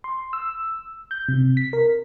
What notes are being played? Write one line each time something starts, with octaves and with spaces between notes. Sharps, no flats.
C6
E6
G6
C3
B6
A#4